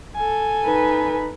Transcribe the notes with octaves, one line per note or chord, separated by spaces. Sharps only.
A4 G#5
D#4 B4